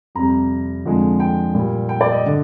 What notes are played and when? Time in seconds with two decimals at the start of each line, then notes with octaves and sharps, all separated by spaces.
0.15 F2 C3 G3 A#5
0.85 F2 D3 F3 G#3
1.20 G5
1.54 A#2 G3
1.89 G5
2.01 D5
2.12 D#5
2.26 D3